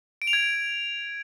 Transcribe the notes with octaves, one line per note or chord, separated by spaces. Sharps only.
D7
F7
G#6